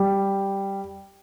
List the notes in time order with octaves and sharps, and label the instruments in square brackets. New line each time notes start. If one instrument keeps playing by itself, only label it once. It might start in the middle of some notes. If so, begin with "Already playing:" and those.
Already playing: [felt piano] G3